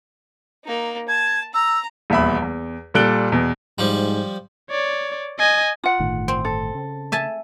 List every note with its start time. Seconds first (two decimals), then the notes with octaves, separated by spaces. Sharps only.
0.65 A#3 D#4
1.08 A5 G#6
1.54 A#5 E6
2.10 D#1 E2 E5 B5
2.42 E2
2.94 A#2 G3 A4 F#6 D7 G7
3.32 E2 B2
3.78 G#2 F3 G3
4.71 C#5 D5
5.39 D#5 G#5
5.84 F4 F#5
6.00 G1 A2 D#3
6.28 C4
6.45 A4
6.75 C#3
7.12 E5 G#5 A5